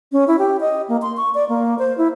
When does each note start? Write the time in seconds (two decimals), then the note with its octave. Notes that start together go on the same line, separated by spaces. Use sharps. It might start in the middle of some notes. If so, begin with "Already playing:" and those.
0.12 C#4
0.28 E4
0.39 G4
0.61 D#5
0.89 A#3
1.02 C6
1.17 C#6
1.35 D5
1.49 A#3
1.79 C5
1.98 E4